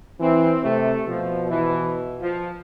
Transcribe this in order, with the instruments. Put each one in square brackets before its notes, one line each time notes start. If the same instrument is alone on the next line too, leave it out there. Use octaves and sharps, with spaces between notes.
[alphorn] E3 [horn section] C4
[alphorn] C3 [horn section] A3
[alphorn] B2 [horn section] F3
[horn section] E3
F3